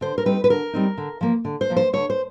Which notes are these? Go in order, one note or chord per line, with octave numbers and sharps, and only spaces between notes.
D3 C5
A#4
G3 C4 D#4 B4
B4
D3 A#4
G3 C4 D#4
D3
F3 A#3
D3
C5
F3 A#3
C5
D3 C#5
C5